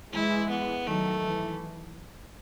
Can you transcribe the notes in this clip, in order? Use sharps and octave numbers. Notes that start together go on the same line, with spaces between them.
E3 G#3 E4
B3
D#3 F#3 A3
E3